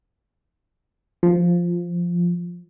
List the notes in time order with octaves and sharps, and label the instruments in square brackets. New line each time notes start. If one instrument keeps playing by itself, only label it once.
[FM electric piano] F3